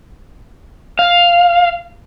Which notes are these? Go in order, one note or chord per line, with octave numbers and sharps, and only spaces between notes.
F5